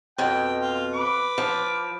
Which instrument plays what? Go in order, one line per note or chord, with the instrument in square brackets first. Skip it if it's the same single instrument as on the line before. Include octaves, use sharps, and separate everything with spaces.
[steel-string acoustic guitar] F2 B2 [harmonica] G5
[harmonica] F4
B4 D6
[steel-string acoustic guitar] F3